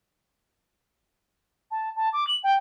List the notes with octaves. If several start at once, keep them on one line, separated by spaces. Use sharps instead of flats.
A5
A5
D6
F#7
G5